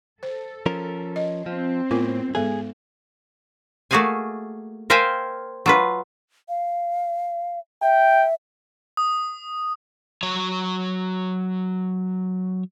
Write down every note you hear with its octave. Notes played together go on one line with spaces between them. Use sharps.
A4 C5
F3 C#4 A#4
D#5
F3 C4
A2 B3 F4 A#4
G#2 G#3 B3 G#4 A4
A3 A#3 F#4 G#4 F5 G#5
A#4 C5 E5 F5 G5 G#5
F#3 F4 B4
F5
E5 G5
D#6
F#3 C#5